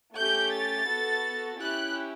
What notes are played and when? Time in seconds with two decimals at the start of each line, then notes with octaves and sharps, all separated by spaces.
0.15 A3 C#4 G4 G6
0.51 A6
0.87 B3 F#4 A4
1.59 C#4 E4 G4 F#6